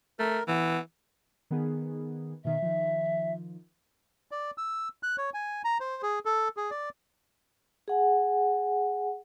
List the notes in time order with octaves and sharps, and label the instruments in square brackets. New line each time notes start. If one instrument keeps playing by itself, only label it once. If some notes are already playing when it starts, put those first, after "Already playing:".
[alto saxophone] A3 [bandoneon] A#4
[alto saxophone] E3 [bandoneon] B3
[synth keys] D#3 B3 G#4
[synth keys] B2 D#3 [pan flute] E5
[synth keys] D#3 F3
[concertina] D5
E6
F#6
C#5
G#5
A#5
C5
G#4
A4
G#4
D5
[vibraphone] G#4 F#5 G#5